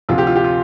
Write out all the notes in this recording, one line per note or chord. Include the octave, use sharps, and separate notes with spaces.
D2 C3 F3 F4
G4
F4
G4
F4